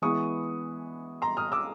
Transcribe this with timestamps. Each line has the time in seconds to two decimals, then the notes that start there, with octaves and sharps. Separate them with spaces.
0.02 E3 G#3 B3 E4 C#6 D#6
1.22 A#5 C6
1.37 D#6 F6
1.52 D6 E6